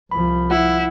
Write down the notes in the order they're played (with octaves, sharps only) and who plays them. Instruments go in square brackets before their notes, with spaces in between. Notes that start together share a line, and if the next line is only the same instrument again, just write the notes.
[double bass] C2 F3 [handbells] B5
[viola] E4 [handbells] F#5